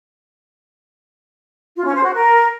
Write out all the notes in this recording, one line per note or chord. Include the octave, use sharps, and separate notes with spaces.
F4
C#4
C5
F#4
A#4